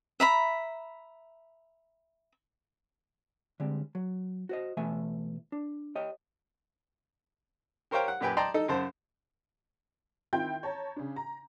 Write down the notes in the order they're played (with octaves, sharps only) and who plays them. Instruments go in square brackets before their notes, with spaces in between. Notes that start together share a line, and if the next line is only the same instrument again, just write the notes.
[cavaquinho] E5 A#5 B5
[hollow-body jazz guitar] D3 G3 G#3 C4
F#3
F#4 C5 D#5
B2 E3 A3 E5 G#5
D4
G4 C#5 D#5 G5
[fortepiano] G4 A#4 C5 C#5 F5 G5
F#5
F#2 A#2 G4 B4 G5 G#5
D5 D#5 G5 A5 A#5 C6
D#4 A4 D#5
F#2 C#3 C5 A5
[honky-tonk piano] D#3 C4 E4 F4 G5 G6
C#5 A5 A#5
C#3 D4
A#5